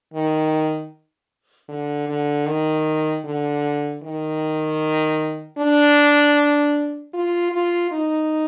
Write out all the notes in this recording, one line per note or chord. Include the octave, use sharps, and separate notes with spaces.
D#3
D3
D3
D#3
D3
D#3
D4
F4
F4
D#4